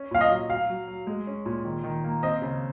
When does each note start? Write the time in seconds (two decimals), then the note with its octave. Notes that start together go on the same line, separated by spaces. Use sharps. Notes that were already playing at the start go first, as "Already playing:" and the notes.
Already playing: C#4
0.11 A#2 F5
0.21 D#5
0.31 F#3
0.50 F#3 F5
0.70 F#3
0.88 F#3
1.07 G#3
1.27 C#4
1.46 A#2
1.65 D#3
1.84 D#3
2.04 A#3
2.23 C4 D#5
2.42 C#3